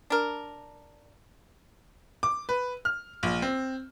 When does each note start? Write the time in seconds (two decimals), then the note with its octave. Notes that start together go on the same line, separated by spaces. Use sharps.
0.10 D4 A#4
2.23 D6
2.49 B4
2.85 F6
3.23 A#1
3.42 C4